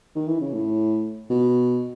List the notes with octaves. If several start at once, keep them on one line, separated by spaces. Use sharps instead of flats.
D#3
E3
C#3
A2
B2